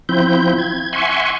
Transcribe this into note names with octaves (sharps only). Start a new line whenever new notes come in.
F3 C4 E4 G6
G#6
E5 F#5 G#5 C6 C#6